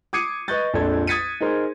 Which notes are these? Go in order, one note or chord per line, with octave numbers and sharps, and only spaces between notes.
D6 D#6 G#6 C7 C#7 D#7
B4 D#5 C#6 F#6 G6 A6
A#1 F2 D4 A4 G#6
D#6 G#6 A6 B6 C#7 D#7
D#4 G#4 A#4 C5 C6